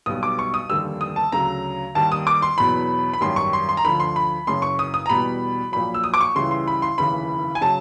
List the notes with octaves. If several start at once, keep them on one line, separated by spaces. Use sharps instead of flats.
B1 B2 G3 D#6
D6
C#6
D#6
F1 D#2 D3 G3 E6
D#6
A5
D2 C#3 F#3 A#5
D#2 D#3 G3 A5
D#6
D6
C6
E2 B2 F#3 B5
B5
G#1 F#2 D#3 G3 C6
C#6
C6
C6
A#5
D2 D3 F3 B5
C6
B5
F#1 F#2 C#3 C6
C#6
D#6
D#6
A#5
E2 B2 G3 B5
A#1 A#2 F#3 B5
E6
D#6
D6
C#6
C#2 C#3 E3 G3 C6
C6
B5
C6
F1 D#2 C#3 E3 B5
G#5
C#3 F#3 A5